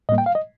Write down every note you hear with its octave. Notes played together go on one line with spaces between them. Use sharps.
A2 G3 A#3 D#5
G5
F5
D#5